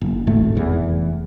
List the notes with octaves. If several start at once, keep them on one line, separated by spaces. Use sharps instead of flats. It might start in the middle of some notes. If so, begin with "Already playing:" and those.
F#1
D#1 G#1 A2 A3
F1 E2 E3